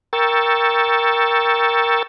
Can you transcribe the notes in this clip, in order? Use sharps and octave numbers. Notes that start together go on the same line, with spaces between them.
A#4 G5 C#6 E6 A6